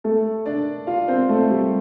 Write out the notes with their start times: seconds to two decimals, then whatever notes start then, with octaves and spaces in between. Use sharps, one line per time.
0.04 A3 A4
0.46 D4 D5
0.87 F4 F5
1.08 C4 C5
1.29 A3 A4
1.50 G3 G4